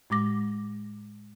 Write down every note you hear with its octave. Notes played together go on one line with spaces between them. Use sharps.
A2 G#3 D6 A#6